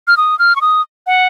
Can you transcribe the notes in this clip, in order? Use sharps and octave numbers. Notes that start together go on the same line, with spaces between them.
F6
D#6
F6
C#6
D#6
F#5